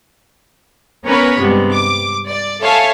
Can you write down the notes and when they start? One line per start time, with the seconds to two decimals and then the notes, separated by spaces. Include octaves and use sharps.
1.05 B3 C#4 A#4 B4 C#5 B5
1.38 G2 C3 G#3 B3
1.72 D6
2.28 D5
2.61 A4 C#5 E5 F5 G#5 A5